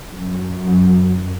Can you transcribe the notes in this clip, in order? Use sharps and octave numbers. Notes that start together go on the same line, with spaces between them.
F#2